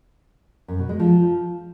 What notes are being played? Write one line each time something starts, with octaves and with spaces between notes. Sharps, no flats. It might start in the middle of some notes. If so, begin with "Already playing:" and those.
F#2
B2
G#3
F3